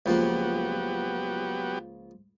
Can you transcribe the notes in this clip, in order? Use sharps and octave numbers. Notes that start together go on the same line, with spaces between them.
C#2 F3 F#3 A#3 B3 G4